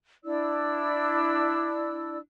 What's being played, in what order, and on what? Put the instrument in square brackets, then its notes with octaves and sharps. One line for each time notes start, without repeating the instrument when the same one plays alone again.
[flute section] D4 E4 D5 E6